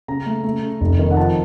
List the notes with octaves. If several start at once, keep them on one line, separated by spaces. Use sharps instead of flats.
C#3 A#5
A3
A3
C#3
F1
D#3
F#5
F3 A5